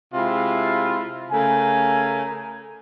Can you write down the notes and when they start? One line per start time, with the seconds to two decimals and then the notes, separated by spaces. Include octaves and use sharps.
0.14 C3 G#3 E4 F4
1.32 C#3 A3 A#4 G#5